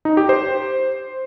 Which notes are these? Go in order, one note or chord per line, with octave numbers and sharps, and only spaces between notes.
D#4
G4
C5